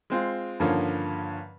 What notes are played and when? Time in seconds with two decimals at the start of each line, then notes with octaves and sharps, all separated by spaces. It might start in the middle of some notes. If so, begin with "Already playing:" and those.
0.10 G#3 C4 F4
0.60 G2 D3 D#3 F3 A#3 C#4